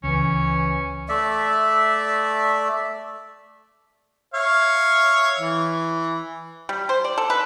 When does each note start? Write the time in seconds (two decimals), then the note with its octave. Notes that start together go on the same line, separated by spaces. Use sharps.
0.04 C#2 E3 C#4
1.09 A3 D5 E5
4.34 C#5 E5 F5
5.39 E3
6.69 G3
6.89 C5
7.04 D5
7.18 A4
7.30 B4